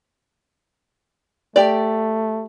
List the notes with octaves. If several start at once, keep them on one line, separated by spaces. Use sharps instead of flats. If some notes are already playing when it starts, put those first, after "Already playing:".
A3 G4 D5